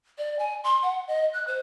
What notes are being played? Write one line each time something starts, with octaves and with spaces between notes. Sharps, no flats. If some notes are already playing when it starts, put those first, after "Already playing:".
D5
G#5
C6
F#5
D#5
F#6
C5